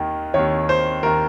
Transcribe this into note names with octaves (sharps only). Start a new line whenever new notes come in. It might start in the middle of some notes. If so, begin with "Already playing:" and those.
Already playing: D#2 D#3
D#2 D#3 C#5
C5
D#2 D#3 A#4